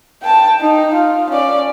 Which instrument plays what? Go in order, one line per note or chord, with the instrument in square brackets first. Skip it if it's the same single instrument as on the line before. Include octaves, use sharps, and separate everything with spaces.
[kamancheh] G5 A5
D#4
F4
C#4 D5